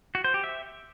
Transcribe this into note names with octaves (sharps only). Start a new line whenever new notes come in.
F#4
C5
G4
E5